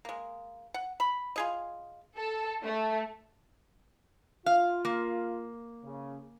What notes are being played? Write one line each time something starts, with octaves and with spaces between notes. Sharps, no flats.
G#3 A#3
F#5
B5
F4 G#4 D#5
A4
A3
F4 F5
A#3
C#3